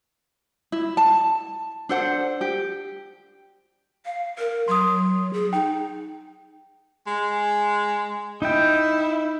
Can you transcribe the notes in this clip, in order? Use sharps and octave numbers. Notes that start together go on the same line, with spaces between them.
E4
A5
D4 A4 C5 F#5
G4
F5
A#4
F#3 C6 D#6
G#4
D#4 G5
G#3
D#4 E4 G5